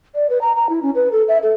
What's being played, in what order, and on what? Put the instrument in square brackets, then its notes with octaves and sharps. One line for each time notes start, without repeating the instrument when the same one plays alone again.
[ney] D5
B4
A#5
A#5
E4
C#4
B4
A4
E5
A4